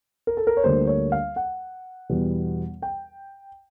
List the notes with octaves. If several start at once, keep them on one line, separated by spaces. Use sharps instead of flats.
A#4
A4
A#4
C#5
D2 D3 G3 A#3 C5
C#5
F5
F#5
E2 B2 G3 B3
G5